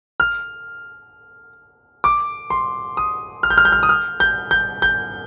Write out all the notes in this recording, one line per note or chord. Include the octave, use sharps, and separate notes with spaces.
F6
D6
C6
D#6
F6
G6
F6
G6
F6
D#6
F6
G6
G6
G6